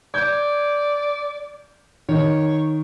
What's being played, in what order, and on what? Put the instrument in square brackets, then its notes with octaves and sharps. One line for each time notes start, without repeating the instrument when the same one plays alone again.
[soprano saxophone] D5 [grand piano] G6 G#6
[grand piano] D#3 [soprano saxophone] C#5